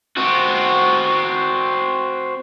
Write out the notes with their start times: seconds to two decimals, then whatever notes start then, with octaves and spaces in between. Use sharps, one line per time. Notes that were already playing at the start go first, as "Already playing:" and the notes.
0.17 C4 F#4